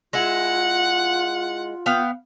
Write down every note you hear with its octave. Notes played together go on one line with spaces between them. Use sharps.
G#3 E4 F4 F#5
B3 F5 G5